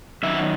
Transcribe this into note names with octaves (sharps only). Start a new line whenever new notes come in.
F#2 D#3 F#3 E5